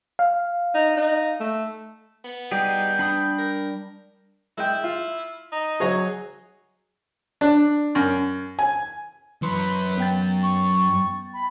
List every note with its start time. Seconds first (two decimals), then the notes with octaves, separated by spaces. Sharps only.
0.19 F5
0.75 D#4
0.97 D#4
1.40 A3
2.25 B3
2.52 G3 D#4 G4 G#4 G6
2.99 D4 B5 D#6
3.38 A#4
4.58 G#3 E4 G5
4.84 F4
5.52 D#4
5.80 F#3 F#4 G#4 C#5 D#5
7.41 D4
7.95 F#2
8.59 G#5
9.42 F#2 E3 B4 C#5 C6
9.98 B3 G5 A6
10.43 C#6
11.34 B5